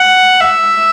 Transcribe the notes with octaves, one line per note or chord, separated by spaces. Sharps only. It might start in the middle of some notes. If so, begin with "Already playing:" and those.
Already playing: F#5
E5